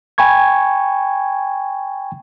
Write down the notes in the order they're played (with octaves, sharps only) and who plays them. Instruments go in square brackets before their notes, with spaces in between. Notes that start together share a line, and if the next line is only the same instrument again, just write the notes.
[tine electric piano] G5 G#5 B5 C#6 G#6